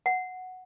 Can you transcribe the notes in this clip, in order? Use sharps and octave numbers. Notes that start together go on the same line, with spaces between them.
F#5